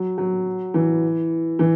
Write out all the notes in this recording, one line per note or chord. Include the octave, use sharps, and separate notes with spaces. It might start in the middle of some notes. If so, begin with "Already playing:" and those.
Already playing: F#3
F#3
E3
E3